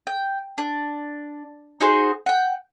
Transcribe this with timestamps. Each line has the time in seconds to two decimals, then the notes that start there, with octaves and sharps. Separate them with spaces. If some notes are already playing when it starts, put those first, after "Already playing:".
0.07 G5
0.58 D4
1.81 D#4 F#4 G#4 C5
2.26 F#5 G5